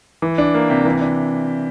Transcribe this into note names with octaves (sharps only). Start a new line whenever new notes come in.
E3
D4
A#3
C3
E3
D4